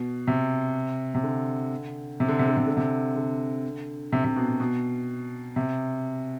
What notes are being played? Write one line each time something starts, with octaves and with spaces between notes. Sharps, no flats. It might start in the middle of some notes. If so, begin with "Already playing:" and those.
Already playing: B2
C3
C3
D3
C3
D3
C3
D3
C3
D3
C3
D3
C3
C3
B2
B2
B2
C3